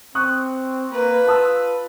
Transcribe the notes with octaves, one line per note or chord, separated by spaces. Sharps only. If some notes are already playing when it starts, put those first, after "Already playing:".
C4 C#6 D#6 F#6
A#3 B4
F4 A5 D#6 E6